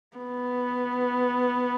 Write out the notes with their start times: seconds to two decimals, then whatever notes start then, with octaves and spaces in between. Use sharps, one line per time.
0.17 B3